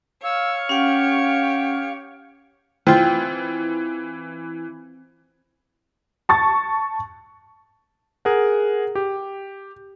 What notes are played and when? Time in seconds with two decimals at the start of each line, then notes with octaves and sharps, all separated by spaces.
0.24 C#5 F5 E6
0.69 C#4 G4 F#5
2.87 E3 C4 F4
6.29 A5 C#6 A6
8.25 G#4 A#4 F#5
8.95 G4